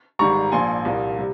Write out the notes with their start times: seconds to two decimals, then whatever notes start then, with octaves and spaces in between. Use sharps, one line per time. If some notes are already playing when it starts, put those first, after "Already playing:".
0.19 G#1 G#2 G3 A#5 C#6
0.52 A#1 A#2 F3 G#5 C6
0.85 C2 A#2 G3 A#3
1.18 C3 G3